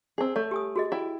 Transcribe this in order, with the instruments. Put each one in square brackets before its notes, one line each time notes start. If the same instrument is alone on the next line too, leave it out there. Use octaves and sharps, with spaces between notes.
[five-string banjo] C4 G#4
[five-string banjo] A3 [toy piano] C#5
[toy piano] G4 G#5 D#6
F#4 G#4 D#5
[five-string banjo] E4 G5